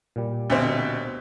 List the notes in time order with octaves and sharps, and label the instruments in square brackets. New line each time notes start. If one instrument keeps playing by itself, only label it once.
[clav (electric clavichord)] A#2 G3
[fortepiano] D2 B2 C4